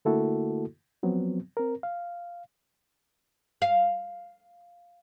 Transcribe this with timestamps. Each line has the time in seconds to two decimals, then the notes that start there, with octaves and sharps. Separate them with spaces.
0.05 D3 A3 A#3 E4 F#4 A4
1.03 F3 F#3 B3 C4
1.57 C4 A#4
1.83 F5
3.62 F5